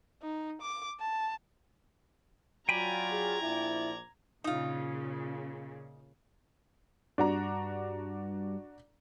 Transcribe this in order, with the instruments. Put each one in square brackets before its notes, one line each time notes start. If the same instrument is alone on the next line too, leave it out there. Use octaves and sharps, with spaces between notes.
[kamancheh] D#4
D6
A5
[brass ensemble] F#3 F4 D5 [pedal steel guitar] G5 G#5 B5 [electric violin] A#5 G#6
[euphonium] G#4
[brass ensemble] A#1 F3 D5 [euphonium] E4
[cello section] A#2 C#3 [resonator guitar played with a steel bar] D#4 F4
[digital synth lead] G2 [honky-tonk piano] D4 F#4 A#5